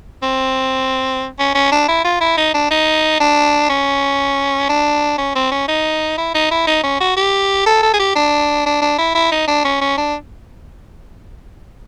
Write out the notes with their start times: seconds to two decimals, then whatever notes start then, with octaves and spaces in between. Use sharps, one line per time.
0.23 C4
1.39 C#4
1.54 C#4
1.71 D4
1.88 E4
2.04 F4
2.20 E4
2.37 D#4
2.54 D4
2.71 D#4
3.20 D4
3.69 C#4
4.69 D4
5.18 C#4
5.35 C4
5.51 C#4
5.68 D#4
6.17 E4
6.35 D#4
6.51 E4
6.67 D#4
6.83 C#4
7.00 F#4
7.16 G4
7.66 A4
7.82 A4
7.94 G#4
7.99 G4
8.16 D4
8.66 D4
8.81 D4
8.98 E4
9.15 E4
9.32 D#4
9.47 D4
9.64 C#4
9.81 C#4
9.97 D4